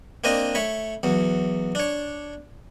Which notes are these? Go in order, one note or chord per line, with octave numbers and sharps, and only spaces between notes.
A#3 C4 D4 C5 D#5
A3 C#5 B5
E2 F#3
D4 C#5